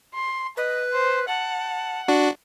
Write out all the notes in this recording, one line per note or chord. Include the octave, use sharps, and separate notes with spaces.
C6
B4 D#5
C5
F#5 A5
D4 F#4